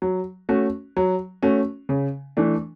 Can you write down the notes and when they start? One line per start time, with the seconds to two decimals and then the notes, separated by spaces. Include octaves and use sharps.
0.02 F#3
0.49 A3 C#4 F#4
0.97 F#3
1.43 A3 C#4 F#4
1.89 C#3
2.37 E3 A3 D4